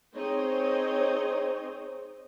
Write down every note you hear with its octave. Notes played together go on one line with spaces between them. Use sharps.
C4 D#4 G#4 C5 C#5 D#5